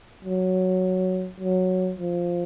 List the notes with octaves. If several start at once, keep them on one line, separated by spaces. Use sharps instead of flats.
F#3
F#3
F3